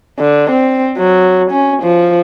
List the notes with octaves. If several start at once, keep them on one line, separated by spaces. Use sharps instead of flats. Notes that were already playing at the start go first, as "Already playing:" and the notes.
D3
C4
F#3
C#4
F3